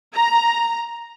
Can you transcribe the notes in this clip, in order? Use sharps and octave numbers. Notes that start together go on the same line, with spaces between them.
A#5